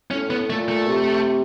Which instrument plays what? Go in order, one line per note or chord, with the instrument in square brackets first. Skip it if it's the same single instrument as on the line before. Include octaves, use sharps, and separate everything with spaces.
[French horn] A2 [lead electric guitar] C#4
[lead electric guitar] B3
[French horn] A#2 [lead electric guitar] A3
[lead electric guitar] A3
[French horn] C3